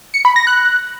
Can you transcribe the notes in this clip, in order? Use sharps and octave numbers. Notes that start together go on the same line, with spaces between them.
C#7
B5
A#6
F#6